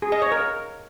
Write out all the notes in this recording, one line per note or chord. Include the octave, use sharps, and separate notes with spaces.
G#4
D#5
C#5
A#4